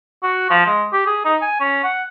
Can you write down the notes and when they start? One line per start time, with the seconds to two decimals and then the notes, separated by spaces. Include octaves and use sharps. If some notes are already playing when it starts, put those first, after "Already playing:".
0.23 F#4
0.50 F3
0.66 G#3
0.92 G4
1.06 G#4
1.25 D#4
1.42 G#5
1.60 C#4
1.84 F#5